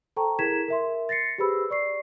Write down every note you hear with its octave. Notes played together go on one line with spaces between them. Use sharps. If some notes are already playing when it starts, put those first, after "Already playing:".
A4 C5 G5 A5 A#5 C#6
E4 G#4 A#4 G#6 B6 E7
A#4 E5 C6
A6 A#6 C7 C#7
G4 G#4 B4 C5 B5 E6
D5 C#6 C7